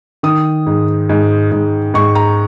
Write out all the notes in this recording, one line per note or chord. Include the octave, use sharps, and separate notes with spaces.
D#3 D#6
G#2
G#2
G#2
G#2 C#6
A#5